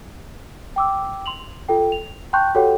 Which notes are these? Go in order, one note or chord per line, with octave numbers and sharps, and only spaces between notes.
G5 D6 E6
C6 F7 F#7
F4 A4 G5
F7
G5 A5 C6 C#6 F#6 G6
F#4 G4 A4 C#5 F#5 G5